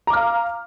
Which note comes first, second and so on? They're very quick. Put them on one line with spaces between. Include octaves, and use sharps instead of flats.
A#5 D6 F6 F5